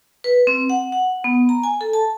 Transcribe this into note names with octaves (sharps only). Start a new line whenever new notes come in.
B4
C4
F#5
F#5
B3
A#5
G#5
A4
A5